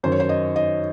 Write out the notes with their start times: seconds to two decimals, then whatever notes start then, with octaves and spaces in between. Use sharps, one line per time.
0.03 F#2 D#3 C5
0.12 C#5
0.20 C5
0.29 D#5
0.56 D#5